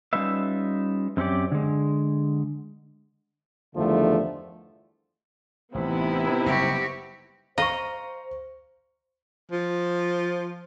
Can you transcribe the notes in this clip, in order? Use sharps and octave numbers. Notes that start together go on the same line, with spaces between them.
G3 C#4 D#4 F4 B4 E5
F#2 C4 C#4 G4 D5
D3 G#3
E2 G2 D3 D#3 F3 A3
A1 C3 E3 B3 D#4 E4
F#1 G3 F#4 G4
C5 D#5 F5 A#5 C#6
F3